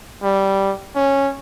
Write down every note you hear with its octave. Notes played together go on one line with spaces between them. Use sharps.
G3
C#4